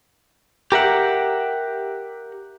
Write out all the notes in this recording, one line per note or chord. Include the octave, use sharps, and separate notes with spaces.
G4 A#4 E5 F#5